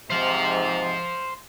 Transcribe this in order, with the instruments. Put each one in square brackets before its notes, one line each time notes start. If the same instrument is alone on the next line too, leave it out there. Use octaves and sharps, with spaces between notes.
[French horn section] G#2 C3 [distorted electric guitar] C5 F5